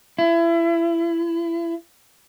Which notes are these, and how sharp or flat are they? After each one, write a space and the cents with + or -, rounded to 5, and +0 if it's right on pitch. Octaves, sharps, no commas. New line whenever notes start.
E4 +30